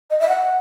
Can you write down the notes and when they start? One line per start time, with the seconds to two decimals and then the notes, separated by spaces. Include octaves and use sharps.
0.10 D#5
0.19 E5
0.28 F#5